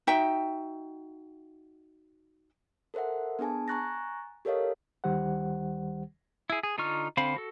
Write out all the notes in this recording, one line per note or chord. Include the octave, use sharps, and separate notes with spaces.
D#4 F#4 E5 G5
A4 A#4 C5 E5 F#5
B3 D4 G#4 G#5 A5
G#5 A#5 C#6 F#6 A6 A#6
G4 A4 A#4 C#5 D#5 F5
D2 D#3 G3 G4 C5 F#5
E4 G#4
G#4
D3 D#4 F4 C#6 F6
D3 C4 C5 F5 B5
F#4 A4